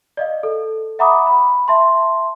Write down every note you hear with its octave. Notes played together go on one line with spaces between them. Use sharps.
D5 D#5 F5
A4
E5 F#5 A#5 B5 D6 D#6
B5
E5 A5 C6